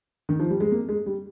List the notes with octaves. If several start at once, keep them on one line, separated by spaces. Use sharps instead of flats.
D#3
F3
G3
G#3
A#3
G#3
G3